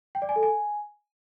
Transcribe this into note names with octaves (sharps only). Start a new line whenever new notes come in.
G5
D5
G#5
A4
G#5